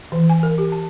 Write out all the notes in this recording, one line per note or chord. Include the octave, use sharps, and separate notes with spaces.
E3
G#5
A#4
G4
A5